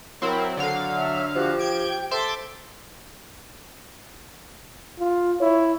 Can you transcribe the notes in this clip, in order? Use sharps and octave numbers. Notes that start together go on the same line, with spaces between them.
F#3 C4 E4 A#4
D3 F5 F#5
E5
F3 F#4 G4
G5 G6 G#6 D7
A4 C5 E5 C6 D6
F4
E4 C#5